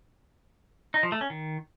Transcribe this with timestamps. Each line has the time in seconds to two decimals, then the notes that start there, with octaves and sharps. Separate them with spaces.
0.94 D#4
1.03 F3
1.12 A3
1.21 C#4
1.30 D#3